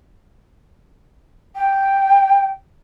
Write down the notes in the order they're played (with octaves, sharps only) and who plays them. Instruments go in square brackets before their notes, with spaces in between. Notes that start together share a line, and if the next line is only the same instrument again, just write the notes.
[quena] G5